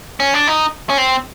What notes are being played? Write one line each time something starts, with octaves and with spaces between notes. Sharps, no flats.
C#4
D4
D#4
C#4
C4